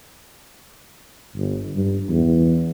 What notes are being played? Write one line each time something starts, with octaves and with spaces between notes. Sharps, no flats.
G1
G2
E2